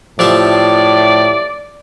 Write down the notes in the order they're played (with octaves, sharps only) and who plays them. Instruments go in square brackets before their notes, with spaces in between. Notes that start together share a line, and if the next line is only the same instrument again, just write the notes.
[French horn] A2 [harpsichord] F3 G4 E5 [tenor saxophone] D5